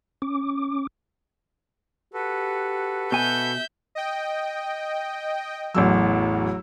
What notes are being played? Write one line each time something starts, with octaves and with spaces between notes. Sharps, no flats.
C#4 D6
F#4 G4 A4 B4
B2 E5 G#5 G6
D#5 G5
A1 E2 F#3 E6